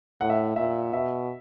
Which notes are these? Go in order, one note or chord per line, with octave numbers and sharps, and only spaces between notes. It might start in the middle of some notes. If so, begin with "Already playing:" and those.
A2 F#5
E5
A#2 E5
B2 E5